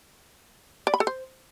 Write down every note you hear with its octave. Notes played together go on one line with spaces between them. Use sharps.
D5
B5
A4
C5